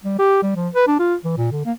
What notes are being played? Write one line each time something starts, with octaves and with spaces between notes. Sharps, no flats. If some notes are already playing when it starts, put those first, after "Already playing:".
G3
G4
G3
F3
B4
D4
F4
E3
A#2
D3
A#3